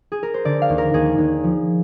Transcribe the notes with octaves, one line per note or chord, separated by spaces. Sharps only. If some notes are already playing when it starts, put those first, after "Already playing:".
G#4
A#4
C5
D3 D5
F5
D#2
A#4
D#2 G#4
D#2
F3